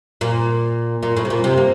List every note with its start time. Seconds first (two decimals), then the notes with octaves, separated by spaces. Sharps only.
0.21 A#2
1.03 A#2
1.17 A2
1.25 C3
1.30 A#2
1.44 C3
1.57 A#3